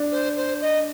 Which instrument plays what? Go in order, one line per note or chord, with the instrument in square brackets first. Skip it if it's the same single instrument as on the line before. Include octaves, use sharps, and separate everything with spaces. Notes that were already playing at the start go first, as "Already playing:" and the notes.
Already playing: [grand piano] D4
[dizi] C5
C5
D#5